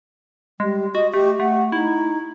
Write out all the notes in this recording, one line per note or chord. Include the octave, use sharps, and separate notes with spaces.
G3 G#3
F#4 D#5
A3 G4
A3 F#5
D#4 E4